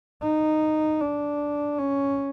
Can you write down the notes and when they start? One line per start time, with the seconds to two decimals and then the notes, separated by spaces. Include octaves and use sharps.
0.22 D#4
1.01 D4
1.78 C#4